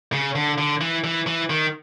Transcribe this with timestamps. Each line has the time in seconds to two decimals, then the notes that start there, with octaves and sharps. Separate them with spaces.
0.13 C#3
0.35 D3
0.58 D3
0.81 E3
1.04 E3
1.27 E3
1.50 D#3